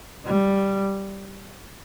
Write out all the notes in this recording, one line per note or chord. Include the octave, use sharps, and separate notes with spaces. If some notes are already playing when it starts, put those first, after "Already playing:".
G3